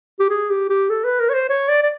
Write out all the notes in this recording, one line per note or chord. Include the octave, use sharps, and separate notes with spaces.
G4
G#4
G4
G4
A4
B4
A#4
C#5
C5
C#5
D5
D5